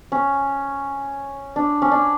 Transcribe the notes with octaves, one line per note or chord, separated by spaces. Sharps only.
C#4
D4
C#4
D4